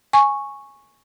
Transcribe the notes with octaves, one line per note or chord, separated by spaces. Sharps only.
G#5 C#6